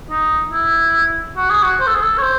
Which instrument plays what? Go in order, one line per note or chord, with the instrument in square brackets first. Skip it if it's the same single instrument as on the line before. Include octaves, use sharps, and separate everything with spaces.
[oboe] D#4
E4
F#4
G#4
F#4
C5
A4
G#4
A4
C#5
C5